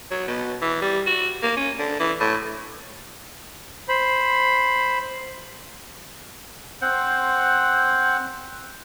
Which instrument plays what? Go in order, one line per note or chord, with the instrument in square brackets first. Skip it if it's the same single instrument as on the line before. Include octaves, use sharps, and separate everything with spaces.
[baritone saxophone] F#3
B2
E3
G3
F#4
A#3
C#4
D3
E3
A2
[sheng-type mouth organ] C5 B5
[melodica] C4 C5 F#5